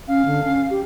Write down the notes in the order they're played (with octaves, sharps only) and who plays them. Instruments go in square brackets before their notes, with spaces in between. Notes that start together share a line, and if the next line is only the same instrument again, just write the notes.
[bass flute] C#4 [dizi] F5
[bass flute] D3
C#4
G4